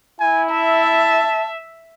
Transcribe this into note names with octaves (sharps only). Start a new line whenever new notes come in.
E4 G#5
E5 A5